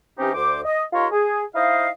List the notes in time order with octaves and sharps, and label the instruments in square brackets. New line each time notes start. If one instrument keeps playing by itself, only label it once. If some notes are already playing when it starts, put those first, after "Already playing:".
[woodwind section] E3 C4 C#4 D#4 G4
D2 C5 D6
D#5
D#4 F4 G4 A#4 C#5 C6
G#4
D#4 E4 C5 D#5 F5